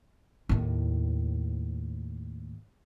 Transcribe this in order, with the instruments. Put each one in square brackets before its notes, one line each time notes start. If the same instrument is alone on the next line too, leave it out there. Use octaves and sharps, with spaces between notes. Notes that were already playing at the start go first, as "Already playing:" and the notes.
[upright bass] D#2 A2